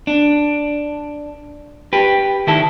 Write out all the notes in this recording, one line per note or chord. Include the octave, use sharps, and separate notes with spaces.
D4
G4 B4
D#3 E4 A4